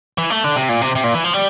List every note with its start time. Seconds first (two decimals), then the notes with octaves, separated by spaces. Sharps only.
0.18 E3
0.30 A3
0.44 D3
0.56 C3
0.69 A#2
0.82 C3
0.95 C3
1.04 A#2
1.14 E3
1.24 F3
1.34 G3